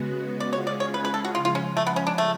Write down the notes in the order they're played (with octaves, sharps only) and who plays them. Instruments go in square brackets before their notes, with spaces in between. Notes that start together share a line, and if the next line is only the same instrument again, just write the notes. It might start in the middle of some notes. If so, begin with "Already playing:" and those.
Already playing: [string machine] C#3 G#3 B3 F#4
[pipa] D5
[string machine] G#3 C#4 F4 G#4 [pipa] C#5
[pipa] D5
C#5
B4
B4
A4
F#4
[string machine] C#3 F3 G#3 [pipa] F4
[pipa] F4
C#4
A3
B3
C#4
D4
A3